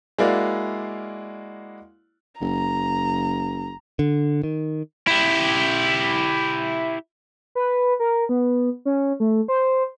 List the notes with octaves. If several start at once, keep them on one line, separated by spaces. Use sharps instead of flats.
G#3 A#3 E4 F#4 D5 F5
F#1 A#5
D3
D#3
E4 G4
B4
A#4
B3
C#4
A3
C5